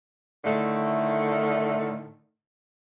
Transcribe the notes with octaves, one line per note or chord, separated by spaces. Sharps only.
A2 D3 D#3 A3